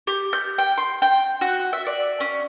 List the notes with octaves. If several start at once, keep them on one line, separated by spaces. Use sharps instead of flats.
G4
G6
G5
C6
G5
F#4
E5
D5
C#4